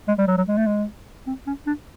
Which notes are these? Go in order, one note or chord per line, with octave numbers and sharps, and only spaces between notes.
G#3
G3
F#3
F#3
G#3
A3
G#3
C4
C#4
D4